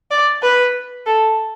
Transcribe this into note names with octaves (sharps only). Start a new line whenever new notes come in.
D5
B4
A4